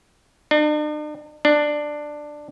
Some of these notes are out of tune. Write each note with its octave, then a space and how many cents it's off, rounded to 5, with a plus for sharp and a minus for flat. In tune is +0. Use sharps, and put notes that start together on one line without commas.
D4 +45
D4 +10